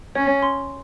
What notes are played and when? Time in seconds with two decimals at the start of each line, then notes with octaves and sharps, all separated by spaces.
0.15 C#4 C#5
0.42 C6